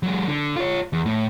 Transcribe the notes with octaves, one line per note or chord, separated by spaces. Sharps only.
F#3 G#3
D3
F4 C#5
E2
A2